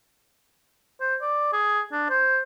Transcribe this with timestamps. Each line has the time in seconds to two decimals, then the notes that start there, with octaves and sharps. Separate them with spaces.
1.01 C5
1.21 D5
1.53 G#4
1.92 D4
2.10 C5